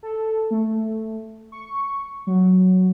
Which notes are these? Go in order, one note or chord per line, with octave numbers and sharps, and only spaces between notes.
A4
A3
C#6
F#3